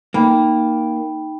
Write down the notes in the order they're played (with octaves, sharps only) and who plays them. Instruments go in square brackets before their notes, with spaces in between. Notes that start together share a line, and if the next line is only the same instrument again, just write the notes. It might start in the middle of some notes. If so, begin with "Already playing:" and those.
[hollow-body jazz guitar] A#3 [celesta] D#4 G5 B5